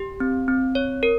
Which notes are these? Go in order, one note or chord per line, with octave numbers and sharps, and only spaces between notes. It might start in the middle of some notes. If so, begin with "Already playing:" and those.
Already playing: G4
C4
C4
C#5
A#4